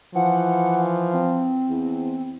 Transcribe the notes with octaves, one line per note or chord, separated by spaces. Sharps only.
E3 F3 F#5
C4
E2